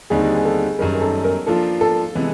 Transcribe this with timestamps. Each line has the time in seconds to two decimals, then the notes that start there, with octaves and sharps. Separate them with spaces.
0.10 D#2 D3 G3 C4 D#4 G#4
0.36 G#4
0.45 A4
0.79 F#2 D#3 G3 A#4
0.94 A#4
1.01 A4
1.24 A#4
1.47 F3 A#3 D4 F4 A4
1.81 A4
2.15 C3 E3 G#3 B3